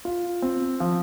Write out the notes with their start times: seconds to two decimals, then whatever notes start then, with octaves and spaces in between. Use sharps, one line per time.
0.05 F4
0.42 C4
0.80 F3